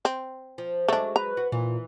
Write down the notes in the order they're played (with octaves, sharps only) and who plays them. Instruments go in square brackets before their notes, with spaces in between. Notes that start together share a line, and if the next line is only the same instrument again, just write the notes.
[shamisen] C4
[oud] F3
[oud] F#3 G#3 [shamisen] A3 D4
[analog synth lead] B4 [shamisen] A#5
[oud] F#4
[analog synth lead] A#2 [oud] E3